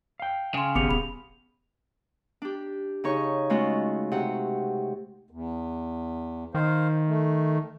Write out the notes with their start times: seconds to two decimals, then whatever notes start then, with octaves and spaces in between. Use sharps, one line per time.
0.20 F5 G5
0.54 C#3 G#5 C6
0.75 G#1 B3 G4 G#4 D6 C#7 F7
0.89 D#1 B5 F7
2.42 D4 G4
3.04 C#3 D#4 C#5 C#6
3.50 G#3 A3 C#4 F4 F#4
4.12 C3 F#5
5.31 E2
6.55 D#3 C5 F5
7.07 A3